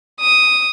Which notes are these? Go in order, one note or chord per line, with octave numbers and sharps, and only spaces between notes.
D#6